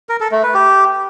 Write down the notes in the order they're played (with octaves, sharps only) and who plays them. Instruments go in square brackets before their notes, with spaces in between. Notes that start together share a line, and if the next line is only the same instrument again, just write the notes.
[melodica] A#4
A4
A3
B4
G4